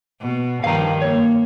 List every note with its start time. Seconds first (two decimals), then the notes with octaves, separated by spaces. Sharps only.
0.21 B2
0.64 G2 D#3 F3 F5 A#5
1.02 A#3 C#5